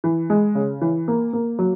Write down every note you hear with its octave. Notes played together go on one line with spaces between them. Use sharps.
E3
G#3
C#3
E3
A#3
A#3
F#3